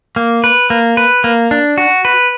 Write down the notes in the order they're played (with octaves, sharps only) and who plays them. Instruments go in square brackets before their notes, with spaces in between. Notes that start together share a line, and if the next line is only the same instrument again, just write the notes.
[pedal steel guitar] A#3
B4
A#3
B4
A#3
D4
F#4
B4